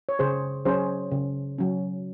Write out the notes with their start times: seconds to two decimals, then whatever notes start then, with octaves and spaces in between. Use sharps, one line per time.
0.09 C#5
0.19 C#3 G#4 C5
0.65 F#3 C#4 G#4 C5
1.11 C#3
1.58 F#3 C#4